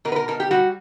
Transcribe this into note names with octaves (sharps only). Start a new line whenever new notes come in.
B2 A#4
B4
A#4
B2 A#4
G4
G3 F#4